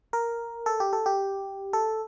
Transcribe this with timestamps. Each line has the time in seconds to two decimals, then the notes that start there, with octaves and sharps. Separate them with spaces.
0.13 A#4
0.66 A4
0.80 G4
0.93 A4
1.06 G4
1.73 A4